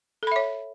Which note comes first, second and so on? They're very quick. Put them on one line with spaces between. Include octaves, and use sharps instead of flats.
A4 B5 E5 C#5